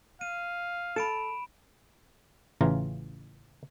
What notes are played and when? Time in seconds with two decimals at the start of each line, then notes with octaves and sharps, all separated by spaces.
0.21 F5 D#7
0.96 A4 B5 D7 E7
2.61 A1 C#3 E3 F4 A#5